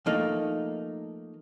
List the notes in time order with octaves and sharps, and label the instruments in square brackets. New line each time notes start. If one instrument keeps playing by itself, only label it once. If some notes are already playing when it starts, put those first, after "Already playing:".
[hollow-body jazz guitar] F3 A3 A#3 D#4